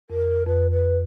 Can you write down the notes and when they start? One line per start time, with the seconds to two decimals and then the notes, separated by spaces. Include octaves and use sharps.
0.09 F2 A#4
0.46 F2 B4
0.71 B4